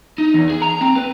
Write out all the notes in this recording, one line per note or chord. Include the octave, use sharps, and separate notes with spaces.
D#4
E2
G#4
A#5
C4
B4